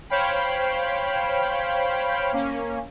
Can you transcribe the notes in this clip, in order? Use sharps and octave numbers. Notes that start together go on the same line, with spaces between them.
C5 C#5 F5 G5 B5
A#3 C#4